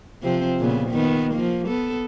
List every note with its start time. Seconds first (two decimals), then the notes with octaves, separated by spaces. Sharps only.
0.22 C3 F3 C4
0.59 A#2 C#3 B3
0.91 D#3 B3
1.33 F3 A#3
1.67 B3 A4